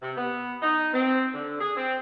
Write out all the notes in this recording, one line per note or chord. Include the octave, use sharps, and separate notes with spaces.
C3
B3
D#4
C4
D3
G#4
C4